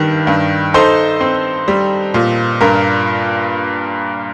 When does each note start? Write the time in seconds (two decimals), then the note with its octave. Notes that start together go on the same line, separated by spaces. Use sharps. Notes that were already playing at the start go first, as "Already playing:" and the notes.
Already playing: G2 D#3 G3
0.27 G2
0.74 D#4 A4 C5
1.21 C4
1.68 G3
2.14 A#2
2.61 G2 A#4